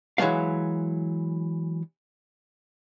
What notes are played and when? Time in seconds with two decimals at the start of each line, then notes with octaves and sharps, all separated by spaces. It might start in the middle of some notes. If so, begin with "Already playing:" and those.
0.18 E3 F#3 G#3 A3 F5